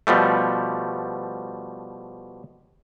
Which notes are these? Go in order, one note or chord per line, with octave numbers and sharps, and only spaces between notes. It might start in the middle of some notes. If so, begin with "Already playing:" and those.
B2 F3 G3 A3